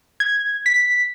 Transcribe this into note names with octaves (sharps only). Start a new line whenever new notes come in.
G#6
B6